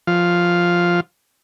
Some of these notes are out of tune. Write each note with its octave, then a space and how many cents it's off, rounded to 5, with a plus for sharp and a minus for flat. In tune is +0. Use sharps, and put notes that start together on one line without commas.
F3 +0 F5 +0